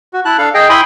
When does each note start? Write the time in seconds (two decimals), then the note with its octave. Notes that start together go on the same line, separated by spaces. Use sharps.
0.13 F#4
0.25 E4 A5 F#6
0.38 D4 A4 F5
0.54 G#4 D#5 G5
0.69 E4 G5 G#5 B5 C6 D#6